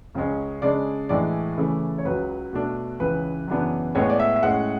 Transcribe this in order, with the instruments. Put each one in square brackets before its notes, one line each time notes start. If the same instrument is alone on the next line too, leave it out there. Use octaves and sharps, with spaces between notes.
[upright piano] C#2 C#3 G#3 C#4
C#3 G#3 D4 D5
A2 E3 G#3 D4 D5
C#3 E3 A3 E4
C#5
C#2 C#3 F#3 B4
B2 A3 D4
C#2 C#3 E3 B4
F#2 C#3 E3 B3 D4
A2 G#3 B3 C#5
D5
E5
E5
A2 G#3 C#4 F#5